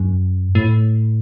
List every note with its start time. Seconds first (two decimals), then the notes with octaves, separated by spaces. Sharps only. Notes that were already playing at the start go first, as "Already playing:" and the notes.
Already playing: F#2
0.55 A2